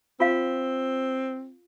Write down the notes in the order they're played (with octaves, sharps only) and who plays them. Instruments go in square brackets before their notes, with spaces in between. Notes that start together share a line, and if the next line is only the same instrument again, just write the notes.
[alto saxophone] C4 [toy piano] F4 F5